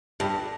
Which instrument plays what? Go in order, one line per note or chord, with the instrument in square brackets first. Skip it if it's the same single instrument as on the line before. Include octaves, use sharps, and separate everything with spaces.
[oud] G2